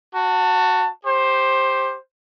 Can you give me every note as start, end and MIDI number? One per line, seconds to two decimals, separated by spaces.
0.15 0.90 66
0.15 0.90 81
1.05 1.98 67
1.05 1.98 72